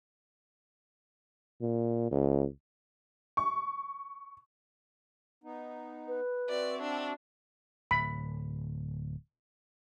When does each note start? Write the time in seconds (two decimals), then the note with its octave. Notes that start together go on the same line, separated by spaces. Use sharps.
1.61 A#2
2.11 C#2
3.37 C#6
5.44 B3 D#4
6.08 B4
6.49 C4 F#4 D5 E5
6.82 D4
7.91 D1 B5